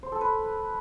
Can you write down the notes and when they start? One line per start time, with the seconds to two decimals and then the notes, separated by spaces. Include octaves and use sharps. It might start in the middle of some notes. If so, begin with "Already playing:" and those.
0.03 C5
0.12 A4
0.21 B4